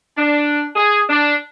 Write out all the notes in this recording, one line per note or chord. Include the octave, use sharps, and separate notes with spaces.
D4
G#4
D4